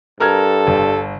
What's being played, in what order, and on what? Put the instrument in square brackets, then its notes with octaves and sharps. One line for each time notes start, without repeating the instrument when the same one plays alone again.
[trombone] G2 [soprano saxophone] A4 [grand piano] A#4 F6 G#6
[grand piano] G1